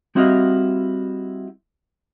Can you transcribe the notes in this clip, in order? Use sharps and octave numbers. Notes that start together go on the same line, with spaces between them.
G3 C4 E4 F#4 D#5 F5